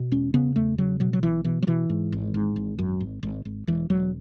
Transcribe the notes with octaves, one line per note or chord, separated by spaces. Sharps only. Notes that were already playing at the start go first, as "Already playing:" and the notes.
Already playing: B2
E1 C#4
C#3 B3
E2 A3
C#3 F#3
B2 F#3
F#3
B1 E3
B2 E3
F#3
B2 E3
G#2
G#1
G#2
G#1
F#2
G#1
G#1
G#1
E1 E3
E1 F#3